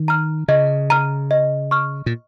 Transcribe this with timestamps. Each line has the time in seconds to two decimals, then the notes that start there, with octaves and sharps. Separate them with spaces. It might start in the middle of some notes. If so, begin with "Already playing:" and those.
Already playing: D#3
0.08 A#5 F6
0.48 C#3 D#5
0.90 A#5 F6
1.31 D#5
1.71 C#6 F6
2.06 A#2